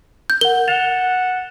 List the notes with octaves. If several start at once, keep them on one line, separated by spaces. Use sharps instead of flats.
G6
A#4 F#5 G7
F#5 A6 E7 F7